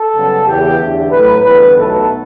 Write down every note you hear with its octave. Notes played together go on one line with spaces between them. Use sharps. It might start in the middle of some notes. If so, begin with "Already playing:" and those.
Already playing: A4
F#2 C#3 G3 B3
E2 C#3 E3 G4
E2 D3 A3
A2 F#3 A3 B4
E2 D3 G3 B3 B4
B1 B2 F#3 A3 A4